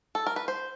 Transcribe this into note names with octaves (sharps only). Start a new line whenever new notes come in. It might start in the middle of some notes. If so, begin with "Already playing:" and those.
A4
A#4
B4
C5